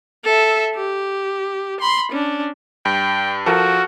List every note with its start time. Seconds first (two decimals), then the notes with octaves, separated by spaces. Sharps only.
0.24 A4 E5
0.75 G4
1.80 B5 C6
2.12 C#4 D4
2.85 G2 G5
3.46 F3 F#4 A4 A#4